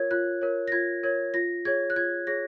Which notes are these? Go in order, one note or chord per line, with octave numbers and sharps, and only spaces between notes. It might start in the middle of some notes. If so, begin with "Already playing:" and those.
Already playing: F4 A#4 C#5 G#6
F4 F#6
A#4 C#5
A#6
F4 G#6
A#4 C#5 G#6
F4 A#6
G#4 C#5 G#6
F#6
F4 G#6
G#4 C#5 A#6